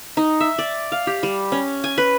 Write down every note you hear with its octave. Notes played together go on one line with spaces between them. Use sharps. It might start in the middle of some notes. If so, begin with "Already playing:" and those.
D#4
E5
D5
F5
G4
G3
C#4
G#5
B4